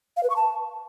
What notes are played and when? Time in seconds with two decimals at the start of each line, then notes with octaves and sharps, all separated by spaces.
0.17 F5
0.23 B4
0.30 C#6
0.36 A5